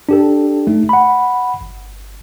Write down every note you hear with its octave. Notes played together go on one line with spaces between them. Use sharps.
D4 G4 A4
A3 D#4
F#5 B5
G1